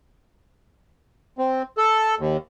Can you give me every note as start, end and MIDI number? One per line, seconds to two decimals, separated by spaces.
1.38 1.62 60
1.78 2.15 69
2.19 2.37 39